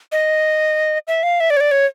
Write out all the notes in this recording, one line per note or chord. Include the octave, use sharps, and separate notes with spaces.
D#5
E5
F5
E5
D5
C#5
D5
C#5